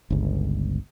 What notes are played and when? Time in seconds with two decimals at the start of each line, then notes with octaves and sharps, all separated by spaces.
0.10 G1 C#2